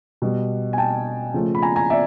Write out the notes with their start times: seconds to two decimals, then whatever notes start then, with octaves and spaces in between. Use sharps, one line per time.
0.22 B2 G3
0.73 G#5
0.78 G5 A5
1.34 C#3 F3 A3
1.55 B5
1.62 G#5 A#5
1.76 G#5 A#5
1.90 D5 E5